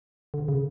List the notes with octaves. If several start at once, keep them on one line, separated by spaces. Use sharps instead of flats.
D3
C#3